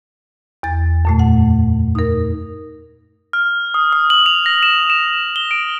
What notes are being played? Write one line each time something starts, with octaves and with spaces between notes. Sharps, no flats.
E2 A6
F#2 A#2 A3
F#5
D#4 A#4
F6
D#6
D#6
F#7
F7
A#6
E7
E7
G7
D7